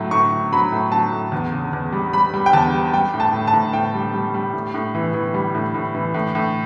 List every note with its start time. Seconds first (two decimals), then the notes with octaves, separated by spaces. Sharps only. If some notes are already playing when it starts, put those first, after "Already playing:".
Already playing: A2 F#3
0.11 A2 C#6
0.32 A2
0.53 F#3 B5
0.72 A2
0.92 F#3 A5
1.12 A2
1.32 E2
1.52 C#3
1.73 E2
1.92 G3
2.13 G3 B5
2.34 G3
2.46 G5
2.53 E2 A5
2.73 G3
2.94 G3 G5
3.14 A2
3.20 A5
3.33 A2
3.47 A5
3.53 A2
3.73 A2 G5
3.94 G3
4.14 G3
4.34 G3
4.53 A2
4.74 A2
4.95 E3
5.14 E3
5.34 G3
5.55 A2
5.74 A2
5.95 E3
6.14 A2
6.35 A2